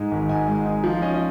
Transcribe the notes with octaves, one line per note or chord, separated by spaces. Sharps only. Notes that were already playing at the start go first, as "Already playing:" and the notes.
Already playing: G#2 G#3 D#4
G#1
G#2 G#5
G#3
D#4 G#5
F3 F5
C#4 D#5
D#5